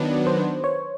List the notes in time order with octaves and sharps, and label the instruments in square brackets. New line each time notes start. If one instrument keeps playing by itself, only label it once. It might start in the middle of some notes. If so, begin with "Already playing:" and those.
Already playing: [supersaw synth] D#3 F#3 B3 D4 [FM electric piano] B4
[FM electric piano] C5
C#5